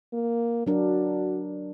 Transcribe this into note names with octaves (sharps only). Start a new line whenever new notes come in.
A#3
F#3 D4 F#4 A#4